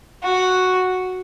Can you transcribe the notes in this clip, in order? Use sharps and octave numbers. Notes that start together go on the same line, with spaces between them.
F#4